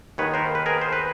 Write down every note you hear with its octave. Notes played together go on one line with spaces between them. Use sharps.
D#2 D#3 G#3 B3 B4 C#5
A#4 C5
B4
G#4 A#4
C5
B4